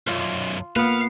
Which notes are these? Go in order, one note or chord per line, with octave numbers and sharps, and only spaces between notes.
B1 F#2 F4
A#3 B3 F4 B4 F5